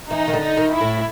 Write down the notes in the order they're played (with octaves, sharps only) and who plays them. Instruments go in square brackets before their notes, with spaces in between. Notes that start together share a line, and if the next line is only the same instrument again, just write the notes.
[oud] E3 [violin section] D#4
[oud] D#3
D3
[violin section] D#4
[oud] D#3
[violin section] E4
[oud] A2